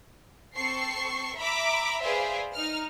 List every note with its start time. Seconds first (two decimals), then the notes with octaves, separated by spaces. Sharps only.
0.55 C4 A4 C#6 C7
1.37 E5 A#5 B5 D6
2.01 G#4 B4 C5 D5 E5 F5
2.55 D#4 F6